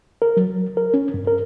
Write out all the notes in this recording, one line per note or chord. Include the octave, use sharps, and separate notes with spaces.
A#4
F#3
A#4
C#4
G2
A#4